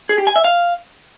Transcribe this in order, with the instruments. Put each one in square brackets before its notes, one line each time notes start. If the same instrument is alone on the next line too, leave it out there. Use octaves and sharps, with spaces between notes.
[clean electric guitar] G#4
G4
G#5
E5
F5